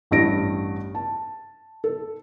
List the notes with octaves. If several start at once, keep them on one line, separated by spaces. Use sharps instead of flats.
A1 G2 D#5 A#6 D7
A5
A4